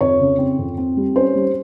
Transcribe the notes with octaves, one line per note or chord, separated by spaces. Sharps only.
F2 C#5
C#3
C4
F2
C4
G3
C#4 C5
G3